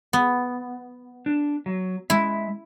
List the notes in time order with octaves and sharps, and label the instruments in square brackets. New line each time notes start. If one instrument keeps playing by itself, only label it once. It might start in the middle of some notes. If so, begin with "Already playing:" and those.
[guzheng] B3
[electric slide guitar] D4
F#3
[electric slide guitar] G#3 E5 [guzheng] E4